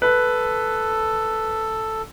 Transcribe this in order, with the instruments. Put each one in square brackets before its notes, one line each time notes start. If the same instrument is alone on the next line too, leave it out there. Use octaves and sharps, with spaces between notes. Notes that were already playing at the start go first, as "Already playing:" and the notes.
[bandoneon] A4 [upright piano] B4